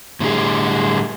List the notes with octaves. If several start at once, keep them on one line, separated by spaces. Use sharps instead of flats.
A2 D3 G3 G#4